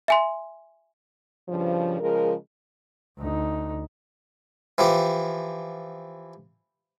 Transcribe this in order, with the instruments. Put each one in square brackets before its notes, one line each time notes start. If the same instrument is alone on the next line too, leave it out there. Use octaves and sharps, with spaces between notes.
[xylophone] E5 G#5 C6
[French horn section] G2 C#3 F3
C#3 F3 G#3 A#4
[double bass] D2 D#4
[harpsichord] E3 F3 G4